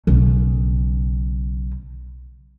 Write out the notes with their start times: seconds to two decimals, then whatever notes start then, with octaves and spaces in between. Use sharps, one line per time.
0.07 B1 C#3